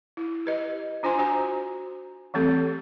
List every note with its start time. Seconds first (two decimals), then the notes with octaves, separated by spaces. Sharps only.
0.17 E4
0.46 G4 B4 D#5
1.03 D4 F4 C5 G#5 C6
1.19 D4 F#4 C5 G#5 A#5
2.34 E3 G3 A3 C4 G4 A4